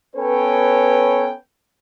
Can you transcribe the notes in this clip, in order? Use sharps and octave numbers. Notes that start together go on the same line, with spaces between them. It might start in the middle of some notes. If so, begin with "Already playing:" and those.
B3 C#4 A4 B4 C#5 G5